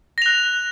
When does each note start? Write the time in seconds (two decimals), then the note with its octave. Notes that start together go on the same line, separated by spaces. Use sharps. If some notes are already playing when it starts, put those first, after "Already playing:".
0.18 A#6
0.22 F7
0.26 F#6